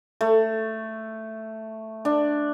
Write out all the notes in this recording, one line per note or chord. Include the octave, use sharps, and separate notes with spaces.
A3
D4